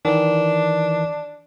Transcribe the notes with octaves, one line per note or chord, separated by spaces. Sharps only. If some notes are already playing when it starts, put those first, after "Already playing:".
D#3 E3 D4